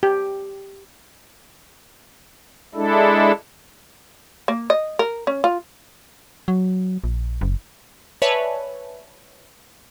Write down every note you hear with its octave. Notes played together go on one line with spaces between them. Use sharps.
G4
G#3 D4 E4 A4
A#3
D#5
A#4
C#4
F4
F#3
A#1
F#1
B4 C#5 D5 E5 G#5 A5